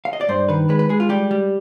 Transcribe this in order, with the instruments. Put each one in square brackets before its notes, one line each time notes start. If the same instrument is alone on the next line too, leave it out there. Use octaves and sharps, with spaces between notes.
[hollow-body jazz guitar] F5
D#5
D5
G2 C5
D#3 B4
G#3 B4
B4
G#3 G#4
F4
G3 G4
G3